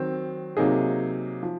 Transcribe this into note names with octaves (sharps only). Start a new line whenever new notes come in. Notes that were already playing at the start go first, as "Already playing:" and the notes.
Already playing: D#3 F#3 C4
C3 F#3 A#3 D#4 G#4
F3